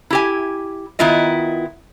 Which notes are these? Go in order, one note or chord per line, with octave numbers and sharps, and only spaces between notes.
E4 G4 G#5
D#3 B3 E4 F4 D#5